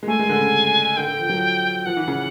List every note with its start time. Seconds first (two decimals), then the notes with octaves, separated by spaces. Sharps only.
0.03 G#3
0.08 A3 G#5
0.19 G#3
0.29 D3
0.41 C#3
0.97 D3 G5
1.07 D3
1.19 F3
1.29 F#3
1.86 F3 F#5
1.97 E3
2.08 C#3